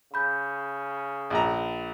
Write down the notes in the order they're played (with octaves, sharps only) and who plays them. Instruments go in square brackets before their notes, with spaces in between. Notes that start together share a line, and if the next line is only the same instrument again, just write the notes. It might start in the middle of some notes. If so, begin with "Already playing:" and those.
[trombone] C#3 [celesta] B5 G6
[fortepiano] A#1 A#5